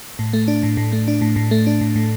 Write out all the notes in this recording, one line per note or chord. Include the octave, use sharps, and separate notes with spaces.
A2
A3
D4
A2
A2
A3
D4
A2
A2
A3
D4
A2
A2